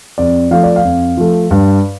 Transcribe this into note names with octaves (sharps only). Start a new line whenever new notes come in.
F2 D5
F3 A3 F5
D5
F5
F2
F3 A3
G2